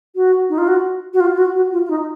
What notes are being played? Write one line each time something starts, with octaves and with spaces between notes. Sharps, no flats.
F#4
D#4
F4
F#4
F#4
F4
F4
F#4
F#4
F4
F4
D#4